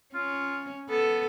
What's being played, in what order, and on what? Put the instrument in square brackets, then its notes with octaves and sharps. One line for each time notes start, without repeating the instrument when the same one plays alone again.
[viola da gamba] C#4 [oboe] F4
[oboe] B3 [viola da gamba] A4